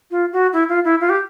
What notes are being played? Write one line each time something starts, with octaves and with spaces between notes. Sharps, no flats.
F4
F#4
E4
F4
E4
F4
G4